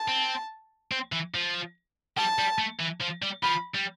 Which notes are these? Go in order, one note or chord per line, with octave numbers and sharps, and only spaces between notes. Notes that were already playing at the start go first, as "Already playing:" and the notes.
Already playing: A5
C4
C4
E3
F3
G3 A5
G3
A3
E3
F3
G3
F3 B5
G3